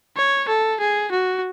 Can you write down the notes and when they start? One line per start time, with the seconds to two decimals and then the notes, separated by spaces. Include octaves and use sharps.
0.17 C#5
0.48 A4
0.80 G#4
1.12 F#4